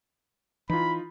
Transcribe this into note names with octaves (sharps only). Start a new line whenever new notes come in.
E3 D#4 F4 B5